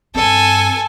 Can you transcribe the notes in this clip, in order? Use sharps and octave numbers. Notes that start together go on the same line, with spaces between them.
G2 C4 A4 G#5